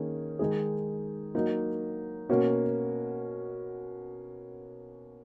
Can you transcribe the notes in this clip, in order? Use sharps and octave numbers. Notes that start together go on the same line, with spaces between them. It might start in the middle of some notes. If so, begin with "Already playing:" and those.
Already playing: D#3 A#3 C#4 G#4
D#3 G#3 D#4 G#4
F#3 A#3 D#4 F#4
B2 A#3 C#4 F#4